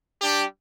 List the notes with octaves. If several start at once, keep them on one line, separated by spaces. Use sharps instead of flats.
G3 D4 G4